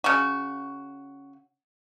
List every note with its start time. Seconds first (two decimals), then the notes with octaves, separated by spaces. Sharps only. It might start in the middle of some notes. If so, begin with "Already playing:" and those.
0.04 C#3 F#4